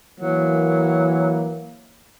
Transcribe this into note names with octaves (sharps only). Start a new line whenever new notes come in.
E3 F#3 A#3